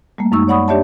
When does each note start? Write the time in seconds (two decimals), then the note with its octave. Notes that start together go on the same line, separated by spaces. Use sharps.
0.18 G3 A3 A#3
0.32 F#2 G#3 D#4 C#6 E6
0.48 C#5 D5 F#5 B5 C#6 D#6
0.68 D4 G4 C#5 D5 E5 A5